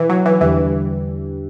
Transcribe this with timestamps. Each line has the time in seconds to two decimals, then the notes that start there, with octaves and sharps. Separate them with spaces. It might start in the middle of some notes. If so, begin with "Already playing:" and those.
Already playing: B2 E3 E4
0.09 F#3
0.26 E3
0.41 E2 D3 E3 G3 D4 G4